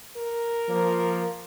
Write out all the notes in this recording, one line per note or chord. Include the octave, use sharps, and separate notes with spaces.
A#4
F3 A#3